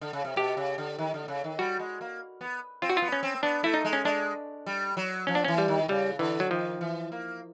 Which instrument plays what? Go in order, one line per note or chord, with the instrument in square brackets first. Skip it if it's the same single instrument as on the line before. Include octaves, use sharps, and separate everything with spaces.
[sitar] D3
C#3
C3
[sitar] B2 [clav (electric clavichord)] G4
[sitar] C#3
D3
D#3
D3
C#3
D#3
[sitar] G3 [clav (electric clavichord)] F#4
[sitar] G#3
A#3
B3
[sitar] C4 [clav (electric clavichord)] F4
[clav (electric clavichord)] F#4
F4
[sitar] B3
[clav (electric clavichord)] C#4
[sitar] C4
[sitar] B3 [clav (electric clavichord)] D4
[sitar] A3 [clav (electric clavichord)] E4
[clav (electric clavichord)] D#4
[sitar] G#3
[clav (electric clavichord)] C#4
[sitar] G#3 [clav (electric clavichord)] D4
[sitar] G3
F#3
[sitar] F3 [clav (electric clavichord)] C#4
[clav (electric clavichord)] D4
[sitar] E3 [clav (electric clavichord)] C#4
[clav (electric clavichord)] G3
[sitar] D#3
[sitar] C#3 [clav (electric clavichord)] G3
[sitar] D3 [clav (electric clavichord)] E3
[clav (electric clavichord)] F#3
[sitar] D#3 [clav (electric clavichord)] F3
[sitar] E3
A#3